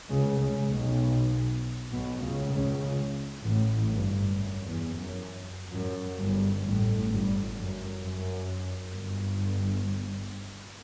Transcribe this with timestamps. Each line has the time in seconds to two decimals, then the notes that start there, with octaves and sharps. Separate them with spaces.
0.09 C#2 C#3
0.39 C#2 C#3
0.70 B1 B2
1.91 B1 B2
2.22 C#2 C#3
2.52 C#2 C#3
3.44 A1 A2
3.90 G1 G2
4.35 F#2
4.66 E2
4.96 F#2
5.73 F#2
6.18 G1 G2
6.64 A1 A2
7.10 G1 G2
7.56 F#2
8.01 F#2
8.92 G1 G2